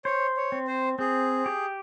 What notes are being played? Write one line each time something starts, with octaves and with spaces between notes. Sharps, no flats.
C5 C#5
C#5
C4
C5
C4 G#4
G4